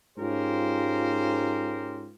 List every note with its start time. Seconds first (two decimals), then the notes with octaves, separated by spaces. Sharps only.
0.18 G#2 C#4 F4 G4 A#4 C5